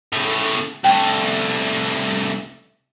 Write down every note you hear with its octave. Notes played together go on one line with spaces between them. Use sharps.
A2 C#3
C2 A3 G5